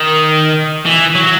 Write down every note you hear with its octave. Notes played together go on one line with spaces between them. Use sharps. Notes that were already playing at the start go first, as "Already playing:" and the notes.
Already playing: D#3
E3
F#3